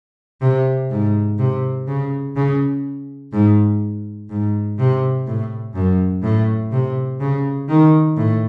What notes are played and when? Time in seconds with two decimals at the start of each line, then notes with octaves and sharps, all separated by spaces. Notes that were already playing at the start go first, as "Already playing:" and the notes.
0.41 C3
0.91 G#2
1.39 C3
1.87 C#3
2.36 C#3
3.33 G#2
4.30 G#2
4.79 C3
5.27 A2
5.75 F#2
6.23 A2
6.72 C3
7.20 C#3
7.69 D#3
8.17 A2